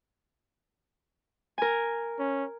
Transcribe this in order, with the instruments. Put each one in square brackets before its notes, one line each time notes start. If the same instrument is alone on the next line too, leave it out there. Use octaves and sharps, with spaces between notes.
[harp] A#4 G#5
[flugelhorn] C#4